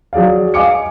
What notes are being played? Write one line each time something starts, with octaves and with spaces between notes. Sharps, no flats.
F#3 G#4 D5 F5
D#5 F5 G#5 D6 C#7